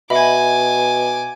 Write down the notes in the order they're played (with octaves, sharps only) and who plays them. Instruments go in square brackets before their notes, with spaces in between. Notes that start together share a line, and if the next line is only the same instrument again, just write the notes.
[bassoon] B2 [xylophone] D#5 E5 B5 [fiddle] G#5 D6